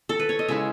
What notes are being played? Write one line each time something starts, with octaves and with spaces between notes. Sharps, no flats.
A4
B4
C#5
D#5
C#3 G#3 C#4 E4 E5